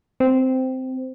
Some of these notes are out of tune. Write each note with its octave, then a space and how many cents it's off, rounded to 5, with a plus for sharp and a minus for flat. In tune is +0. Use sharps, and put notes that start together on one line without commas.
C4 -10